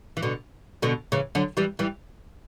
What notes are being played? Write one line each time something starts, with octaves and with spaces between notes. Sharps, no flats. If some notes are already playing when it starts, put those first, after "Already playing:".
E3
B2 D3
B2 D3
C#3 E3
D3 F#3
E3 G3
E3 G3